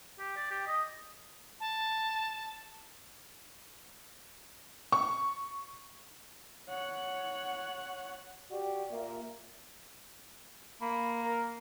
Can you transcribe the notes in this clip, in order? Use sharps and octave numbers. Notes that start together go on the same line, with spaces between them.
G4
D5
G4
D#5
A5
C#6
C#5 F#5
F#4 G4 D5
A#2 A#3 E5
A#3 B5
A#4